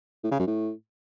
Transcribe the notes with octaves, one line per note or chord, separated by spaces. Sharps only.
A2
C#3
F#2
A2